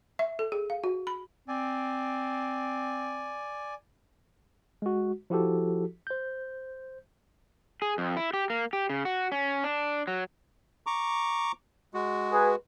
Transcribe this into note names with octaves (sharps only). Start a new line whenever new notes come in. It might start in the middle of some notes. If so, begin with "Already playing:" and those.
E5
A4
G#4
F5
F#4
B5
C4 D5 G#5
G#3 F#4
F3 E4 F#4 G4 A4
C5 G6
G#4
F2
E4
G4
A#3
G4
C#3
F#4
C#4
D4
F#3
A#5 C#6 D6
G#3 F#4
G#4 B4